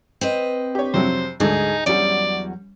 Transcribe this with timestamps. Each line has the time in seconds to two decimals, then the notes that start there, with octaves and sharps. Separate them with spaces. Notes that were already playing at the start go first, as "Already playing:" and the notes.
0.21 C4 B4 D#5
0.75 G4 C#5
0.94 F2 C3 F#3 C5
1.40 D2 G#2 D3 D#4 G#4
1.86 E2 F#3 G3 C#4 D5